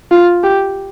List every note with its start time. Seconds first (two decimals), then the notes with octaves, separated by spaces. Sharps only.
0.11 F4
0.43 G4